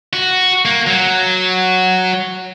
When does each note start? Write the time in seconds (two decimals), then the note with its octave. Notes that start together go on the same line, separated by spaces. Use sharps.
0.13 F#4
0.65 A#3
0.87 F#3